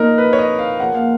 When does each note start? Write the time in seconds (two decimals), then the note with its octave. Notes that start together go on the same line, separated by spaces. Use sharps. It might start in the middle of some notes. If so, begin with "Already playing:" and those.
Already playing: A#2 F3 A#3 D#4 A#4
0.18 B4
0.33 C#5
0.39 D#5
0.59 F5
0.80 C#3 F3 A#3 F#5
0.95 F5